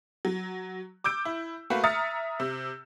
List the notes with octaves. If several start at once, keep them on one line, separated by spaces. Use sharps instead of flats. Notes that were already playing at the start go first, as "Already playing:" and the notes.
F#3
D6 E6 G6 D7
E4
A3 A#3 F#4 B4
E5 A#5 D#6 F6 A6 C#7
C3 E6